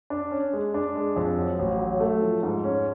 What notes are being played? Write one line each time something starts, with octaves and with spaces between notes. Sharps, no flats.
D4
C#4
G#3
D4
G#3
F2
F#3
A1
F#3
A3
F3
G#2
C#4